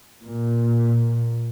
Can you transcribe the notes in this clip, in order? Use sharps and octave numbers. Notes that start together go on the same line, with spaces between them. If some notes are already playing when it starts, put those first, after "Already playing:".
A#2